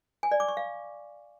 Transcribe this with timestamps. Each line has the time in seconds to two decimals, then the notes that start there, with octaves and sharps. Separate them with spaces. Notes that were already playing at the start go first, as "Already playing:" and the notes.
0.23 G#5
0.31 D5
0.40 D6
0.48 C#6
0.57 F5